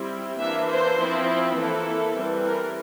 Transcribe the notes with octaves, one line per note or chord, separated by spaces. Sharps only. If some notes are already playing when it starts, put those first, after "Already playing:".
Already playing: G3 C4 E4
E3 A#3 D4 E5
C5
F3 C4 E4
E3 A#3 E4 A4
E3 G3 C4
A#4